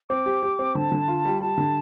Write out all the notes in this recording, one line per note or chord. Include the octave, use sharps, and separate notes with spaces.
C4 D6
G4
G4
C4
D3 A5
D3
F4
G3
G3 A5
D3